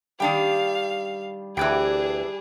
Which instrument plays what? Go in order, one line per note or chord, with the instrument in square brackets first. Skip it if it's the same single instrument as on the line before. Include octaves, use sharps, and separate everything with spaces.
[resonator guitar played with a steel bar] D#3 D4 G5 [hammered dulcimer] G3 [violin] F5
[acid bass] D2 [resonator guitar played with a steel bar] E3 B4 G5 [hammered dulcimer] G3 [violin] D4 G#4